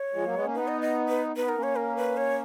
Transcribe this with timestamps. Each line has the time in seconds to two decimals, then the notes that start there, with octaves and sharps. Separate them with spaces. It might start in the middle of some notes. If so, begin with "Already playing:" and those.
Already playing: C#5
0.13 F3 G#3
0.24 F#3 A#3
0.34 G#3 B3
0.44 A#3 C#4
0.54 B3 D#4 B4
0.68 D#5
0.82 D#5
1.09 B4
1.36 B3 D#4 B4
1.46 D#4 A#4
1.56 A#3 C#4
1.63 C#5
1.76 A#4
1.97 B4
2.17 C#5